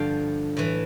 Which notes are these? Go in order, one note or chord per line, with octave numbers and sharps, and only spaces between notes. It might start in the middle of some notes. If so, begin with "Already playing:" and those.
Already playing: G2 D3 F3 F5 G5
A2 E3